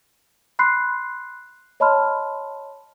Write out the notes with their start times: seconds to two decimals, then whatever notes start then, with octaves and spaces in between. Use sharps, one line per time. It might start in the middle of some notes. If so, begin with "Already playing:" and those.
0.59 B5 C6 F#6 C7
1.80 C#5 D#5 A5 B5 C6 F6